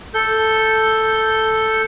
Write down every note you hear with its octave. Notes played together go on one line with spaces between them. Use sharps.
A4 G6